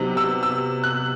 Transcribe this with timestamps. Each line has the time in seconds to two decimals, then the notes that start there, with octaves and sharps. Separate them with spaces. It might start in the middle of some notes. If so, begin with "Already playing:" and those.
Already playing: C3 F#3 B3 D#4
0.17 E6
0.43 E6
0.84 F#6